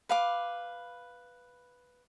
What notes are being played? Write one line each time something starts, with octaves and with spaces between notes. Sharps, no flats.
B4 F5 D6